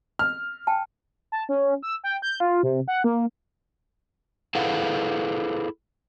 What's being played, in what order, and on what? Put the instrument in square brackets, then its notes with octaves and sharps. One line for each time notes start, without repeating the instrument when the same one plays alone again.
[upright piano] F6
[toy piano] G5 A5
[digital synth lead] A5
C#4
E6
G5
G6
F4
C3
F#5
A#3
[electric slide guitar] E4 G#4 A4 B4 F5 F#5